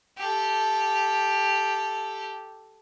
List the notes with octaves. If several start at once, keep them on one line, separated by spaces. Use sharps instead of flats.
G4 A4